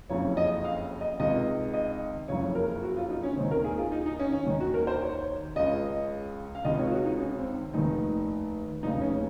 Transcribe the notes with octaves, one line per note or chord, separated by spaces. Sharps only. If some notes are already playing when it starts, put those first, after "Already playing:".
F#1 F2 C#3 C#5
D#5
F5
D#5
C#2 C3 D#3 D#5
D#5
F#1 F2 C#3 C#5
A#4
F#4
F4
D#4
C#4
D#2 D#3 C4
A#4
G#4
F4
D#4
D#4
C#4
C#4
D#2 D#3
F#4
A#4
C5
C#5
C#2 C#3 D#5
F5
C#2 C3 D#3 D#5
C#5
F4
F#4
D#4
C#4
C4
F1 D#2 D#3 D#4
F1 D#2 C#3 D#4
C#4